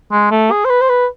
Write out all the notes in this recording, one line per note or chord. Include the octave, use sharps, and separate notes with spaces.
G#3
A3
G#4
C5
B4
C5
B4